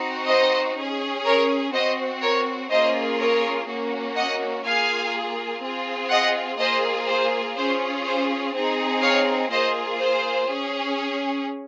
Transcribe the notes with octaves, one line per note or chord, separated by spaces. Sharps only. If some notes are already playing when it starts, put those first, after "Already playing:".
Already playing: C4 D#4 F#4
C5 D#5
C#4 G#4
A#4 C#5
C4 F#4 C5 D#5
A#4 C#5
A#3 C#4 F4 G#4 C5 D#5
A#4 C#5
A#3 C#4 F#4
D#5 F#5
A#3 F4 G#4 F5 G#5
C4 F4 G#4
D#5 F#5
A#3 F4 G#4 C5 D#5
C5
C#4 F4 G#4 C5
C5
C4 D#4 G#4
C#5 F5
A#3 F4 G#4 C5 D#5
C5
C#4 G#4